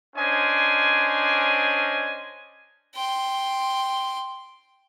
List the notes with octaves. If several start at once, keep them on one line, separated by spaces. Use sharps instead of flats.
C#4 D4 C5 D#5 G#5
G5 C6